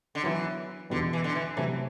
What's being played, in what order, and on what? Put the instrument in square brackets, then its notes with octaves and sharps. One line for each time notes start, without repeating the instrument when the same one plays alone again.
[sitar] D3
[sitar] E3 [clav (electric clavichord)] F#3 B3 E4
[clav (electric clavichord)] E2 B2 G3 [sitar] D3
[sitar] E3
D3
E3
[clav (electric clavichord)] C3 F#3 A3 [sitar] E3